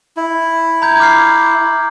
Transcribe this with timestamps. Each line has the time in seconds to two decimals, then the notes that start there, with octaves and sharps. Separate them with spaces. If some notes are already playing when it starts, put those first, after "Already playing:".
0.17 E4
0.82 A#5 G6 G#6
1.00 D6 F6 C7